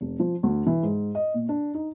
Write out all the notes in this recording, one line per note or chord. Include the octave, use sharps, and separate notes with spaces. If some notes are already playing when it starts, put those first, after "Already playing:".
F1
F3
D2
E3
G#2
D#5
A#2
D4
D#4